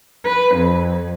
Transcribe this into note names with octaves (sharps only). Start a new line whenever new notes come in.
B4
F2